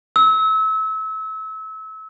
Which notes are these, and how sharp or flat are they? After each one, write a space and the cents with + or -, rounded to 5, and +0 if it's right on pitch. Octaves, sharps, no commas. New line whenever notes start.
E6 -30